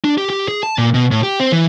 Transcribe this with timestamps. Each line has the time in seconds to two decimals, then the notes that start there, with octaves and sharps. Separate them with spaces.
0.04 D4
0.18 G4
0.30 G4
0.48 G#4
0.63 A5
0.78 A#2
0.94 B2
1.11 A2
1.23 G4
1.40 C4
1.52 E3